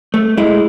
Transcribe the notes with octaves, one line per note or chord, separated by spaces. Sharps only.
A3
G#3 E4